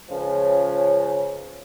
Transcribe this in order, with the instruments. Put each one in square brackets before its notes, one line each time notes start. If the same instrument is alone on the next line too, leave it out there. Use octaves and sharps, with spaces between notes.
[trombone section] C#2 C#3 F3 C#4